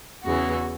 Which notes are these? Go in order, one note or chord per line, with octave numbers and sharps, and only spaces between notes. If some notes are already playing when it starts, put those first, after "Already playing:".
E2 C#3 E3 F#4